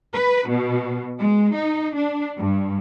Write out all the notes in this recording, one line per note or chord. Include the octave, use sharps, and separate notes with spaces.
B4
B2
G#3
D#4
D4
G2